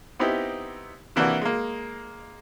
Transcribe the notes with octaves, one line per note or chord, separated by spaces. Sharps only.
B3 C4 D#4 E4 G4
C3 E3 A#3 D4 E4 F#4
G#3 A#3